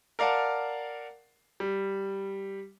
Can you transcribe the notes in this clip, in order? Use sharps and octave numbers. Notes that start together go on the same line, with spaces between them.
A#4 D5 F5 F#5 A5
G3